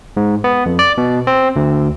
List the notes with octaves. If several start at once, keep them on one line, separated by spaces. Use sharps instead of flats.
G#2
B3
F2
D5
B2
C4
D2